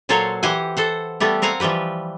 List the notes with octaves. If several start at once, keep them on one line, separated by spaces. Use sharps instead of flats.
A#2 F#3 A4 C5 C#5 F5
E3 G4 C5 F#5 G#5
A4 C5 F#5
G3 A3 B3 G4
C4 A#4 F5 F#5 G#5
E3 F3 G3 G4 B4